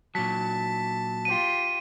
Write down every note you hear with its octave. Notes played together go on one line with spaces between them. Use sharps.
A#2 F#3 A5 B6
F4 G4 D#7